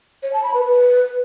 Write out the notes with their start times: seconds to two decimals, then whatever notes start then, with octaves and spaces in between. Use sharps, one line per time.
0.23 C#5
0.33 A5
0.44 B5
0.54 B4
0.64 B4